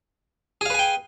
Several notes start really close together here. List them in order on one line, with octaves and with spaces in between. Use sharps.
G#4 F5 B4 G#5 G5